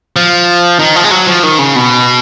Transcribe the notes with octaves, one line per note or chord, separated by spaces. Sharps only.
F3
D#3
F3
G#3
F#3
F3
D#3
C#3
B2